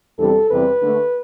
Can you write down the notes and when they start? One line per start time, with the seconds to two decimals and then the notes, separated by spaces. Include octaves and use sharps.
0.18 E2 C3 G3 D4 A4
0.49 E2 C3 G3 B4
0.81 D3 A3 D4